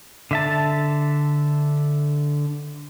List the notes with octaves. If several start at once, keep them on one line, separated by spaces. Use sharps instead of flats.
D3 E5 A5